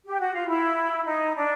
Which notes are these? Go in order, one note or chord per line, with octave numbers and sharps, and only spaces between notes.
G4
F#4
F4
E4
D#4
D4